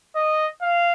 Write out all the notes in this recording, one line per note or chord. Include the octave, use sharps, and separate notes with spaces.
D#5
F5